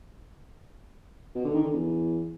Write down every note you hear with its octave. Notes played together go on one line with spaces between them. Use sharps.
B2
D3
D#3
D3
E2